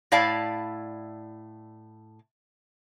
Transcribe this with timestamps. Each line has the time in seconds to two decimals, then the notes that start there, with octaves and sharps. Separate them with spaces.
0.12 A2 E4 D5 F5 A5